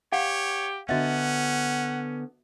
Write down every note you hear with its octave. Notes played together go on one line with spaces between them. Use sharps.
G4 C#5 F5 F#5
D3 B3 C#4 F#4 D#5 E5 F#5